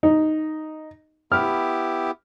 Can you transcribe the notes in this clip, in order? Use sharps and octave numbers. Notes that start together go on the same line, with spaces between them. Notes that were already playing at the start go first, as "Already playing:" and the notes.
D#4
B3 E4 G4 F6